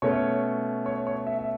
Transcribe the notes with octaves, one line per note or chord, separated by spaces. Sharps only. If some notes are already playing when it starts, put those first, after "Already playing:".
B2 A3 C#4 C#5
C#5
C#5
E5
E5